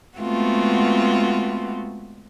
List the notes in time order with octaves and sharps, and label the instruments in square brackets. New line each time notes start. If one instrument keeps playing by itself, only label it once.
[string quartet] G#3 A3 B3 C4 F4 F#4